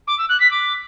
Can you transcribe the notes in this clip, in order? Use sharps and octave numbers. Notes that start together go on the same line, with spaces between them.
D6
E6
F#6
B6
D6